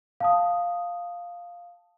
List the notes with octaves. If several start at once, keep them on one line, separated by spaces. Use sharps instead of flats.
F5 A5 D#6